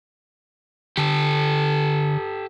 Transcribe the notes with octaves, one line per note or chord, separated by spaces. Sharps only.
D3 G4 A4